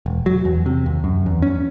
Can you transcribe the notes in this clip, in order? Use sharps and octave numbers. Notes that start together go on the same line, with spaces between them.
E1
F#3
E2
C3
D#2
F#2
E2
C#4